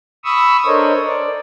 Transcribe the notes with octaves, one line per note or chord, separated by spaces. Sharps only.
B5 C#6 D#6 E6
D4 A4 A#4 C5 C#5 D#5
D5